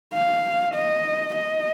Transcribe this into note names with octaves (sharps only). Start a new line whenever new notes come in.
F5
D#5
D#5